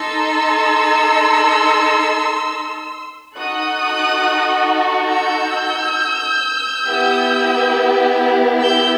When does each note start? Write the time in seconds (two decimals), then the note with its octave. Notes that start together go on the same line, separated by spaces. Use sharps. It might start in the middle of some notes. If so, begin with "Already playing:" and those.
Already playing: D#4 A4 C6 E6
3.36 D#4 F#4 A4 D#6 F#6
5.10 E6 G6
6.86 B3 E4 G4
8.60 E6 G6